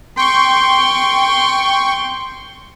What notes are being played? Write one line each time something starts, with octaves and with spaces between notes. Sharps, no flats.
G5 C6 C#6